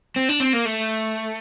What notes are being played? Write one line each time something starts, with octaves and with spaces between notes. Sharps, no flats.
C4
D4
C4
A#3
A3